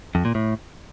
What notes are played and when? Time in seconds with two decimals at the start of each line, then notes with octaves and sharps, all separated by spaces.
0.15 F2
0.25 A#2
0.35 A2